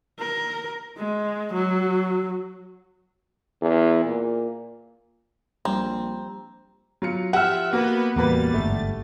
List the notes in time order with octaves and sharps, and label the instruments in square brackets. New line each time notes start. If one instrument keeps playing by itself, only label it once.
[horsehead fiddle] A#4
G#3
F#3
[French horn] E2
A#2
[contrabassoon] A#1 [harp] G3 [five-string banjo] C4 [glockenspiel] A#5
[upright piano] F#3 F4 C#7
[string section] F3 E5 [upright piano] G4 F6 [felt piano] F#5
[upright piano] A#3 F#4 [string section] B3 B4
[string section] A1 G3 A6 [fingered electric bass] E2 [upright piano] A#3 F#4 B4
[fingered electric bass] G1 G#2 [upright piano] A3